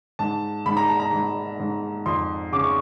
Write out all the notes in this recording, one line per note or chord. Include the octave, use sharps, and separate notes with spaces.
G#2 A5
G#2 B5
A#5
A5
A#5
G#2
G#2
F2 C6
C#3 D6
C#6